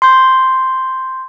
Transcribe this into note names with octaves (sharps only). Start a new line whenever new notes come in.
C6 G6